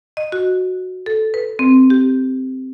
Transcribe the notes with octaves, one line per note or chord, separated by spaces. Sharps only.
D#5
F#4
A4
B4
C4
G4